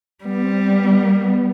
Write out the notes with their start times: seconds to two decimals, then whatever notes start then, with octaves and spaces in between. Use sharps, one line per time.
0.24 G3 B3
0.44 C4
0.64 B3
0.84 B3
1.03 A#3
1.24 B3